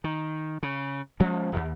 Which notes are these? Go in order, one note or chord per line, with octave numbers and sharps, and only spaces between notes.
D#3
C#3
F3 G#3 C#4
D#1 D#2